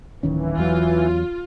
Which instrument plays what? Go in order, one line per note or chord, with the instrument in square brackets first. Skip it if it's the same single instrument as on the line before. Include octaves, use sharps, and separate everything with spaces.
[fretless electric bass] D1 D#3 C#4 [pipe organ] E3
[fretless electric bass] E2 F#3 [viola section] F4